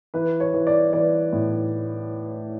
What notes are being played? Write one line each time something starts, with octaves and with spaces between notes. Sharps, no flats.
E3 B4
C#5
E3
D5
E3 D5
A2